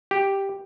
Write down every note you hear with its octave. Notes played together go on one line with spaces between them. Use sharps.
G4